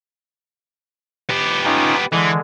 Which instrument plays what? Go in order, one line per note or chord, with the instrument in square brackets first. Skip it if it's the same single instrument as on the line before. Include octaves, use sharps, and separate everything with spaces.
[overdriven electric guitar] B3 G4
[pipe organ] C#4 D#4 F4
[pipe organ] D3 G#3 [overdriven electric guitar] E3